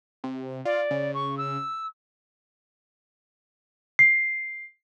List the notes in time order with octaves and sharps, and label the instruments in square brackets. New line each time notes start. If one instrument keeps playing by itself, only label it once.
[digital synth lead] C3
[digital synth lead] F4 [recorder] D5
[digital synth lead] C#3
[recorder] C#6
E6
[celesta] C7